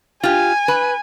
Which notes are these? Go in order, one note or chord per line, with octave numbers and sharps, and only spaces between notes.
F4 G4 G#5
B4